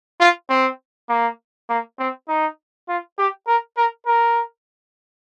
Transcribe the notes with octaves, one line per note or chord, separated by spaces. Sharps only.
F4
C4
A#3
A#3
C4
D#4
F4
G4
A#4
A#4
A#4